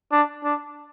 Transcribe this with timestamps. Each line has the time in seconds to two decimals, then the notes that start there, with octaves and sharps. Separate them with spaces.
0.12 D4
0.44 D4